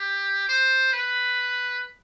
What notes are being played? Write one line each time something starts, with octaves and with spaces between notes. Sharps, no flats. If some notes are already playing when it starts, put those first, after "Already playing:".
Already playing: G4
C5
B4